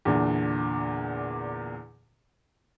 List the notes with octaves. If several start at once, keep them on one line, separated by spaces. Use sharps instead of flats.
E2 A#2 D3